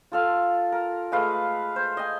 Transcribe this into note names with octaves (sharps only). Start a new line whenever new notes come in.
F4 A4 F5
A#4
G#3 A3 B4 F5
C5
D#5 G#5